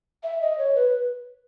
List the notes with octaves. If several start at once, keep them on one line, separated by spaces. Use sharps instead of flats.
E5
D#5
C#5
B4